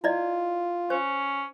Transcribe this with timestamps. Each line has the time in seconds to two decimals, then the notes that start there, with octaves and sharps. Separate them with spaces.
0.04 E4 F4 D5 D#5
0.90 C#4 C5